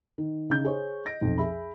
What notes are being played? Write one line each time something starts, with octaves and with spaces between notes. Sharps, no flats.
D#3
C#3 D#4 G6
G#4 C5 C#5
D#5 A#6 D7
B1 F2
G#4 E5 B5